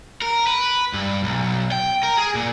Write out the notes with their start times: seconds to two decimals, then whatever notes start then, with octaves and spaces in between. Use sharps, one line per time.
0.22 A#4
0.47 B4
0.94 G2
1.24 B1
1.72 G5
2.03 A#4
2.18 G#4
2.35 A#2